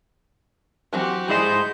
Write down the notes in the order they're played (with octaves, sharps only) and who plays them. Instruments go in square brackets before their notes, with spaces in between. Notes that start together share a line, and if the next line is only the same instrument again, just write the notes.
[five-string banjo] E3 F#3 C4 [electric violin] F#4 G4
[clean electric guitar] G#3 C5 [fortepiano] E4 G#4 D#5 [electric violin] G6